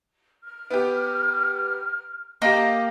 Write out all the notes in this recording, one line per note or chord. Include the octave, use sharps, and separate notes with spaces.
F6
B3 G4
A#3 G4 D#5